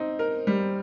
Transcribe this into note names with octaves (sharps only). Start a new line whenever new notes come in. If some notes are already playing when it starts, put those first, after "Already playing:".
Already playing: C4 D#4
A#4
G3